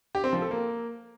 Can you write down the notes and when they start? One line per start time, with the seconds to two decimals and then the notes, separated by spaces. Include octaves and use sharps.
0.15 G4
0.24 C4
0.33 F3
0.42 A4
0.51 A#3